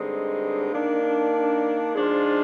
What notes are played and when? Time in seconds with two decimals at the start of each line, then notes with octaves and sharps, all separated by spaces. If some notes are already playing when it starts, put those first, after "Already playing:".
Already playing: G2 D3 G#3 C4 D#4
0.73 D#3 A#3 D4
1.94 G#2 F3 G#3 D4 F4